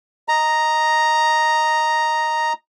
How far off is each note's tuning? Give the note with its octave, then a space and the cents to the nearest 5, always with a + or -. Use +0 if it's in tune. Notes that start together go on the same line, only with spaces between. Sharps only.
D#5 +0 A#5 +0